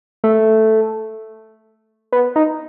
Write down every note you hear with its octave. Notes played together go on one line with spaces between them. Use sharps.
A3
B3
D#4